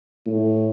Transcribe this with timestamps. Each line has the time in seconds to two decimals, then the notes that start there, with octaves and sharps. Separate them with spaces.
0.27 A2